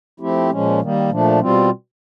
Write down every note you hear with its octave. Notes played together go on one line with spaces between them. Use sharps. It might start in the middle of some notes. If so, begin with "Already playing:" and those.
F3 A3 C4 E4 G4
A#2 F3 G#3 C#4
D#3 G3 A#3
A#2 F3 A3 D4
B2 G3 C4 F4